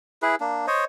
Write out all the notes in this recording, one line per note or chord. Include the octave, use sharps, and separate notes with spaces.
E4 G#4 B4
A#3 D4
C5 C#5 D#5